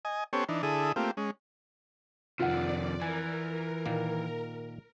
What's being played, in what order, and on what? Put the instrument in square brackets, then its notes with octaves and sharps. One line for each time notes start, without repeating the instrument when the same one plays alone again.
[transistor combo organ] D#5 G#5
B3 C#4 G4 A4 C5 C#5
E3 D4 D#4
D3 E4 G#4 A4 D#6
A3 A#3 C4 F4 G4
G#3 C#4
[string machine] F2 D5 [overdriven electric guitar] C3 D#3 [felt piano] F4 F#5
[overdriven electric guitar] E3 [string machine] A#4 [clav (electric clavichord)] G#5
[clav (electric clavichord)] A#2 D#3 A#3